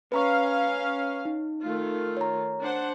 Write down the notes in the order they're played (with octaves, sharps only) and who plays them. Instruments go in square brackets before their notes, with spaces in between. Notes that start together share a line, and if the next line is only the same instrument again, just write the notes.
[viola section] C#4 F5 [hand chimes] B4 A#5 C#6
[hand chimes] D#4
[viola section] D#3 A3 F4
[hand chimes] C#5 A#5
[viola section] D4 C5 F#5